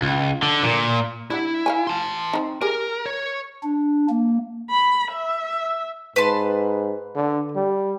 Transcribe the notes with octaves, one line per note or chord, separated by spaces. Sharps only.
C#2
D3
A#2
G3 D4 E4 F#5
F5 G5 G#5
A5 C6
C4 D#4
G4 G#4 A#4
C#5
D4
A#3
B5
E5
G#2 B4 A5 C6
D3
G3